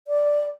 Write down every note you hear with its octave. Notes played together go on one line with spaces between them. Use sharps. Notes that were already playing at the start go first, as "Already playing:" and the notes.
D5